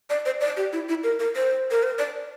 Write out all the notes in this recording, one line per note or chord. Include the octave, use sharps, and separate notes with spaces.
D5
C5
D5
G4
E4
E4
A#4
A#4
C5
A#4
C5
D5